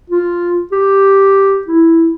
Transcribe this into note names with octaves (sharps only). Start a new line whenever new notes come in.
F4
G4
E4